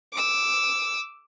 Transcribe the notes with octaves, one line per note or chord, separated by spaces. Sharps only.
D6 E6